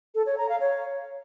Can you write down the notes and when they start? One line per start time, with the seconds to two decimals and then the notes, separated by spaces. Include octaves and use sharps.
0.15 A4
0.26 C#5
0.38 A#5
0.49 F5
0.60 C#5